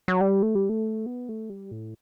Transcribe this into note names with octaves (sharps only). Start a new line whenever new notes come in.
F#3
G3
A3
G3
A3
B3
A3
G3
A2